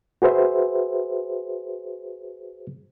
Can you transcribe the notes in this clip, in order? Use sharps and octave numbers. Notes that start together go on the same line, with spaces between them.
F#4 G#4 B4 C5 E5